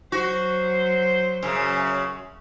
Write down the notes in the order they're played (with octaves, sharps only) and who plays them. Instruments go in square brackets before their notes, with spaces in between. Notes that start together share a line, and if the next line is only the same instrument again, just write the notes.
[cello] F#3 C5 [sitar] F#4
[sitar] F#2 C#3